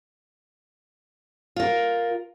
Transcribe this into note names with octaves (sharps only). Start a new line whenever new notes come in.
F4 A#4